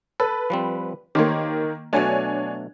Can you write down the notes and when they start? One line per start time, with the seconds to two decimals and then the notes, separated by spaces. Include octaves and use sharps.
0.20 A4 B4
0.50 F3 G3 C4
1.15 D#3 A#3 G4 C5 C#5
1.93 B2 F#3 A3 D4 C#5 G#5